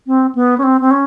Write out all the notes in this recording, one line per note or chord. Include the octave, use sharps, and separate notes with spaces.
C4
B3
C#4
C4
C4
C#4